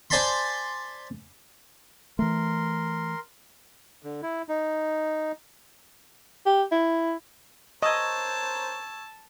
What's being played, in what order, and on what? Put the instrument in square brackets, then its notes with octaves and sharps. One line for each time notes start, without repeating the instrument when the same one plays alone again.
[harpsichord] C5 D5 G#5 A5 B5 C6
[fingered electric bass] E3 A3 [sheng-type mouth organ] A#4 C6
[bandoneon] D3
E4
D#4
[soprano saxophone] G4
E4
[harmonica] A#4 C5 C#5 [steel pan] D#5 [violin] A5 [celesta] C#6 E6 G#6